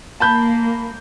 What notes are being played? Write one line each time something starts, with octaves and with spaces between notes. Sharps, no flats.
A#3 A5 B5 G6